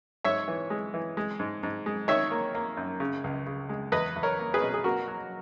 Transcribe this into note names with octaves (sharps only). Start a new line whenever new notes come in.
G#2 C#5 E5
E3
G#3
E3
G#3
G#2
G#2
G#3
D#3 C#5 E5
A#3
A#3
F#2
C#3
C#2
C#3
G#3
E2 B4 D#5
E2
A#4 C#5
A#3
G#4 B4
B2
G#4
A#3 F#4 A#4
F#3